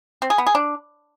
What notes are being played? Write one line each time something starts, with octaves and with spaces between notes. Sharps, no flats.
C4
G#4
B3
G#4
D4